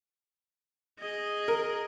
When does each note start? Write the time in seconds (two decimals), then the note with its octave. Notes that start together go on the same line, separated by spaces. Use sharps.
1.00 G#4 D#5
1.48 A#4